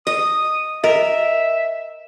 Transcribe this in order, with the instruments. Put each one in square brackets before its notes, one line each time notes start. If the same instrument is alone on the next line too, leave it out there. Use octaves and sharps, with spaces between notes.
[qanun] D#5 [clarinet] D#6
[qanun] A#4 [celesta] D#5 [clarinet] E5